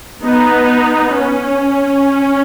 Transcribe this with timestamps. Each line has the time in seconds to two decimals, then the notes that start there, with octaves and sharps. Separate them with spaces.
0.24 B3 D#4
1.14 C#4